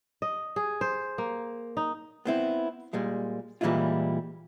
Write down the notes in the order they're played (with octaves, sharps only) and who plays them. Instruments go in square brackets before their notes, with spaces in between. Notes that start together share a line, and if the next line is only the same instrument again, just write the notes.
[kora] D#5
G#4
C5
A#3
D#4
[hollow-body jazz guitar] B3 C4 E4
A#2 G3 G#3
A#2 E3 G3 G#3 E4 F4